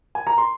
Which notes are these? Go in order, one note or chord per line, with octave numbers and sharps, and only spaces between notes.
G#5
A#5
C6